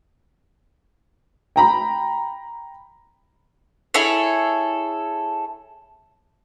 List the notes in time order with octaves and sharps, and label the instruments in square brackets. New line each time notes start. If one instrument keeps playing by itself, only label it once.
[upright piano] G5 A#5 B5
[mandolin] E4 G#4 A4 C#5